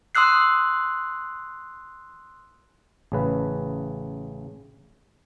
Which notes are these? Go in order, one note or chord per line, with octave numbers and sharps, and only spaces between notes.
C6 D#6 E6 F#6 C7
A1 C#3 B4